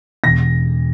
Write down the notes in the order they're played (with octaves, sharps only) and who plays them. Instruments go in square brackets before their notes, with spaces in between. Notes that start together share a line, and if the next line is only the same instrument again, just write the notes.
[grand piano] E1 A#6